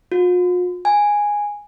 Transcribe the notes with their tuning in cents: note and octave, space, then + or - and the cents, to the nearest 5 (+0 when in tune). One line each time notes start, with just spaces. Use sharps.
F4 +45
G#5 -5